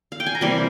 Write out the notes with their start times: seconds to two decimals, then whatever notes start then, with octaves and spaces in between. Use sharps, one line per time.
0.12 F5
0.20 G5
0.26 G#5
0.35 A#5
0.41 C3 E3 G3 A#3 C6